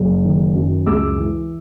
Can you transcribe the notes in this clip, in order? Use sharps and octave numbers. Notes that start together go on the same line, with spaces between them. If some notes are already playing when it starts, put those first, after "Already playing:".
Already playing: F#1
D#3
F#2
C#2 D6 E6
E3